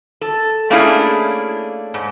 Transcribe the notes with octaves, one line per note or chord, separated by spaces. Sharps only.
A4
A3 A#3 C#4 D4 E4 G#4
G#2